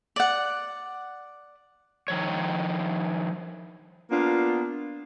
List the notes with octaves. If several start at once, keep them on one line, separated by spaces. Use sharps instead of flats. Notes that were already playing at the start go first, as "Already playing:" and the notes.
D5 F#5
D#3 F3 C#5
A#3 B3 D4 F4